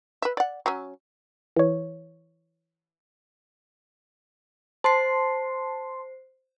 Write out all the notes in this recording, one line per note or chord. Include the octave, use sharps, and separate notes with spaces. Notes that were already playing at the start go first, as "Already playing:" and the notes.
B4 E5
D5 F#5
F#3 C#4
E3 C#5
C5 A5 C6 C7